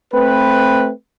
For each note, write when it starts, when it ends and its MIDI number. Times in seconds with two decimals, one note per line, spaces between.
0.12 0.90 57
0.12 0.90 60
0.12 0.90 71